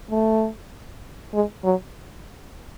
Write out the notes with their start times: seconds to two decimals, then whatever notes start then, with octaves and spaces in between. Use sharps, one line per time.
0.11 A3
1.34 G#3
1.64 F#3